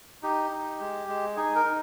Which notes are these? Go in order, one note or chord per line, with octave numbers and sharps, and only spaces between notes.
D#4 G4
D#4
G#3
G#3
D#4 G#4
A#4
D#4